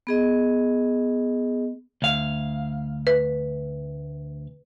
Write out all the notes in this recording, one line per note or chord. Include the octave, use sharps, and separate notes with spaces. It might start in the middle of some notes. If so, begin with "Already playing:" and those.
B3 G#4 D#5
D2 F5
B4